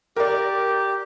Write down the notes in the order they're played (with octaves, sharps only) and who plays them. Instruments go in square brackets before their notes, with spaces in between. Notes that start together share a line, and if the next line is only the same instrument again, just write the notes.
[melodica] G4 [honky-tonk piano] A#4 D5